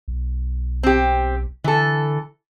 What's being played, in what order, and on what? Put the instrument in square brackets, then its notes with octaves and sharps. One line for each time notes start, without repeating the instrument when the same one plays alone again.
[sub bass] B1
[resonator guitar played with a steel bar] C4 G4
[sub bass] D3 [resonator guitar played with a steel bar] E3 A4